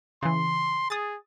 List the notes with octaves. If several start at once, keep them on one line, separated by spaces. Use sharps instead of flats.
C#3 E3 C6
G#4 D#6 A6